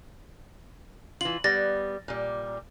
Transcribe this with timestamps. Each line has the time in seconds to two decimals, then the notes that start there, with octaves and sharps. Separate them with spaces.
1.21 E3 F4 F#7
1.44 G3 B3 A6 A#6
2.08 A#2 G3